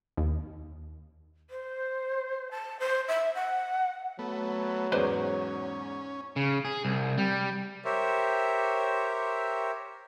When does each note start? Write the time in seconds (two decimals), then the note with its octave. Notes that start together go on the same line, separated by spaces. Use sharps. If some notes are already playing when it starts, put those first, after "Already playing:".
0.17 D#2
1.50 C5
2.51 A5
2.80 C5
3.08 E5
3.35 F#5
4.19 F#3 A3 B3
4.92 E2 G#2 C#4 B4 C5 D5
6.36 C#3
6.65 G#4
6.85 C2
7.18 G3
7.85 G4 A#4 C5 C#5 E5